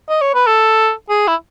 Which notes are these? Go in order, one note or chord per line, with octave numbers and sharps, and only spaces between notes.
D#5
C#5
B4
A4
G#4
E4